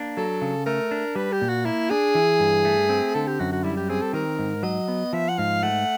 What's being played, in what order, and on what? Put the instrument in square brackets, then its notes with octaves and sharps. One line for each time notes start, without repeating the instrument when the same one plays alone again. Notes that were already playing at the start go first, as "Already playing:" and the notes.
Already playing: [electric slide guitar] A#3 D4
[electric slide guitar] F#3 [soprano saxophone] A4
[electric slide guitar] C#3
[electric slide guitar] A3 [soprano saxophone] A#4
[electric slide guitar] D4
[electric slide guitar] G3 [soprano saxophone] B4
[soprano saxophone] G4
[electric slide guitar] A#2
[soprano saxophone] F#4
[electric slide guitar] A#3 [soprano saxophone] E4
[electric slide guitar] D4 [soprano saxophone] G#4
[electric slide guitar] E3
G2
A3
C4
[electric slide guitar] D3 [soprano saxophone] A4
[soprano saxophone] G4
[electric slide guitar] F#2 [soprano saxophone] F#4
[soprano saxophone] F#4
[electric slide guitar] G3 [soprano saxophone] E4
[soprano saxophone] G4
[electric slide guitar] C4 [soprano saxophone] G#4
[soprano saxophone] A4
[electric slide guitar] D#3 [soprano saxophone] A#4
[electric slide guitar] G#2
[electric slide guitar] F#3 [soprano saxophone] D#5
[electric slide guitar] B3
[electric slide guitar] F3 [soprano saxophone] E5
[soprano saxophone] F#5
[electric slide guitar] G#2 [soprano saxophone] F5
[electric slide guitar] A3 [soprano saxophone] F#5